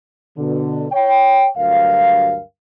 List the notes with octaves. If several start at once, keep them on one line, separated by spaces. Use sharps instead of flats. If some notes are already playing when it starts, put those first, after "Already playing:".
B2 D3
C#5 G5
D2 G2 F#3 A#4 F5